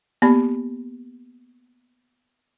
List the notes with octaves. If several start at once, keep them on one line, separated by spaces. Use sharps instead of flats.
A#3 B3 G4 D5 B5